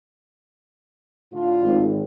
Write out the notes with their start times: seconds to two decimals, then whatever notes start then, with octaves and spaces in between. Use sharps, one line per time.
1.33 A2 D3 F4
1.62 G#1